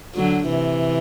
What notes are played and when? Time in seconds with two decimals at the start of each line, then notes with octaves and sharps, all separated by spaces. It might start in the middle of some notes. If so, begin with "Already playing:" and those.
0.15 D3 F#3
0.49 C3 E3